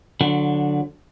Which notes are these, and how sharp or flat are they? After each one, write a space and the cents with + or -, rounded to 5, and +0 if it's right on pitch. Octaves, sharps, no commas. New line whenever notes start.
D3 +0 F#3 -30